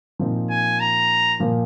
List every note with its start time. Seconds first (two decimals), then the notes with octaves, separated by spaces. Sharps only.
0.19 A#2 F3 C4 D#4
0.50 G#5
0.80 A#5
1.40 A#2 F3 A#3